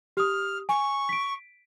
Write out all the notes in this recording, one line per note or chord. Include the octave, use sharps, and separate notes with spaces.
G4 D#6 F6
G#5 C#6
B6 D7